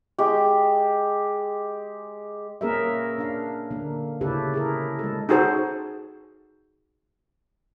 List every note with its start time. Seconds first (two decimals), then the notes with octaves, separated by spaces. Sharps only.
0.18 G#3 G4
2.61 A#3 C#4 G#4 A#4 B4 E5
3.18 D4 F5
3.71 D3 A#3
4.21 C#3 C#4 E4 G4 A4 B4
4.54 E4 G#4 A#4
4.99 G#3 A4
5.29 D#4 F#4 G#4 A4 C5